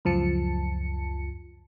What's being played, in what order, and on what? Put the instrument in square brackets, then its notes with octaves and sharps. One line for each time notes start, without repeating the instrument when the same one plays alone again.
[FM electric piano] C#2 F#2 F3 A5 C#7